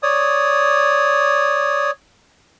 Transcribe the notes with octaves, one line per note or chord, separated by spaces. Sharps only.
C#5 D5 D#6